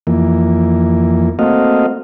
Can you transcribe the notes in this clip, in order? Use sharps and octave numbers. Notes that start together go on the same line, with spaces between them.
F2 E3 A#3
A3 A#3 C4 F#4 D#5 F5